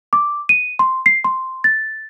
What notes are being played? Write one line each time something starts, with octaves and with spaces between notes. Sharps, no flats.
D6
D#7
C6
C7
C6
A6